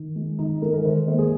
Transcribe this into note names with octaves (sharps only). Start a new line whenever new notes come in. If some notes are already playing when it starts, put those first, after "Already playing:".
Already playing: D#3
G#3
D#3 D#4
G#3 A#4
A#4
D#3 C5
A#3 C5
G#4